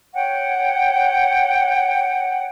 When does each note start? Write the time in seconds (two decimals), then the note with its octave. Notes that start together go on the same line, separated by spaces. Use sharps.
0.14 C#5 F#5 G5